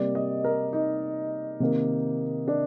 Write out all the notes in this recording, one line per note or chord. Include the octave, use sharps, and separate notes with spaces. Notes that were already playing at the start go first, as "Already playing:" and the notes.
Already playing: C3 G3 A#3 D5
D#5
A#4
D#4
C3 D#3 A#3
D4